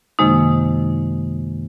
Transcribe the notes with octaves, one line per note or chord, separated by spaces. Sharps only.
F#2 C3 D#3 G#3 A#3 D#4